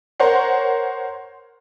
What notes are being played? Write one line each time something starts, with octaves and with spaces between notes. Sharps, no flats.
A#4 C5 C#5 F#5